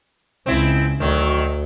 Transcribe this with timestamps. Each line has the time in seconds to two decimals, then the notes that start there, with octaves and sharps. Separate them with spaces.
0.46 C#2 C4 E4
1.00 D2 D#3 F#3